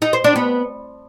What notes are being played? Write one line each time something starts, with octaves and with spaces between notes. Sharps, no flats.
D#4
C5
D4
B3